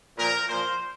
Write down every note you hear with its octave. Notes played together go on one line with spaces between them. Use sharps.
A#2 F3 A#4
A#2 F3 C5